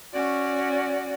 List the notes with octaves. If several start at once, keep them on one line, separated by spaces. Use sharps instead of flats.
C#4 F#4 D5